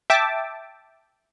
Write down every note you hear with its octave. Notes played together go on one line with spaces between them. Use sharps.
E5 G5 A5 D6